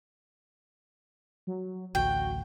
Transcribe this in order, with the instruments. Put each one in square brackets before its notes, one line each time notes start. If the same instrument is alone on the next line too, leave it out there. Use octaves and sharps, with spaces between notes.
[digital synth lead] F#3
[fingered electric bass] A1 D2 [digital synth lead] F#4 [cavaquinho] G5